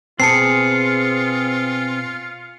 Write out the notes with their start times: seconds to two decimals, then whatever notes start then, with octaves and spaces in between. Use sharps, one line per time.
0.20 B2 C4 F4 G#4 G#5 A5 C7 C#7